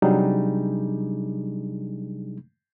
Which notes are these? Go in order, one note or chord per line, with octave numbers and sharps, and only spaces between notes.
C3 F#3 G3 D4 D#4 G#4